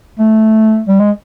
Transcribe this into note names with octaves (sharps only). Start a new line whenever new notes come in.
A3
G3
G#3